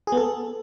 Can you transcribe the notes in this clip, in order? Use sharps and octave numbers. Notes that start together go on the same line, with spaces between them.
G#4
B3
A4